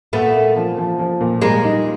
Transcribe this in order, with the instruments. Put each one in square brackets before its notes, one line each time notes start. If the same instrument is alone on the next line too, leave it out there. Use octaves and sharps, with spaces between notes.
[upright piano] A#2 [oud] A3 B3
[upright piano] A#3
F3
F3
F3
A#2
[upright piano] G3 [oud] G#3 A#3
[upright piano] D#4